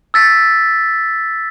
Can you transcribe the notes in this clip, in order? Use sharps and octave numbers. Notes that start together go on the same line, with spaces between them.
E6 A6 B6